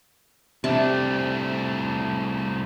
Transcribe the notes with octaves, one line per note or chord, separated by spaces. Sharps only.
C2 C3 A3 D4 A5